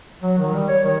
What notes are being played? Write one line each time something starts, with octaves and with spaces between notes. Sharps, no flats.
F#3
D#3
G3
C#5
D#3